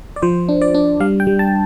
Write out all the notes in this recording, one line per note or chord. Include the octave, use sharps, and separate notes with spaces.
D5
F3 C5
D4
D5
D4
G3 F5
G5
G3
A5